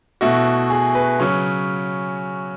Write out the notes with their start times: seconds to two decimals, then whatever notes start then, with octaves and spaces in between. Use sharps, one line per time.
0.21 B2 A3 E4 F#4
0.70 G#4
0.95 B4
1.20 C#3 F#3 C#4 C#5